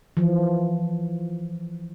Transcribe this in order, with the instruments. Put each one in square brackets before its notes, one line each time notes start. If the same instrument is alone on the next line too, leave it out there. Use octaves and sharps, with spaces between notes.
[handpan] E3 F3